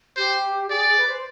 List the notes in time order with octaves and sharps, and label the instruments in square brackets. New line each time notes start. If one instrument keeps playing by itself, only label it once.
[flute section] G4 [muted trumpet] C5
[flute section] G#4 [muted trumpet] D5
[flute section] B4
C5